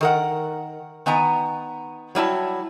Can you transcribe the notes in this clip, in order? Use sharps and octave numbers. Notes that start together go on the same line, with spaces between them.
D#3 A#4 F#5
D#3 B3 G#5 A#5
F#3 G3 E4 A5